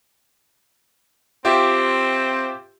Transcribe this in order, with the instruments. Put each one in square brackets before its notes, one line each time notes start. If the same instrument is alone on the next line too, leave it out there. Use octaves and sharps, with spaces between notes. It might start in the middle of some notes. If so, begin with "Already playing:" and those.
[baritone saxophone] C4 [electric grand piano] F4 G4 E5